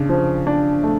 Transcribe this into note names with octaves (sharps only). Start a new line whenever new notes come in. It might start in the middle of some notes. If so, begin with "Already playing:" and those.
Already playing: C#3 D4
F3
D4
A3